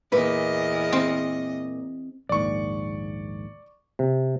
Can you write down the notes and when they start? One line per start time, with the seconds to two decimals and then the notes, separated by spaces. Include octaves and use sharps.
0.12 E2 A#2 B4 D#5
0.93 C4
2.29 A#1 D#2 G#2 D5 C#6
3.99 C3